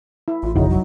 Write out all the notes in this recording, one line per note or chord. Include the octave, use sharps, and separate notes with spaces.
E4
A1 F4
F1 C#3 D#4 E4 F#4
F#3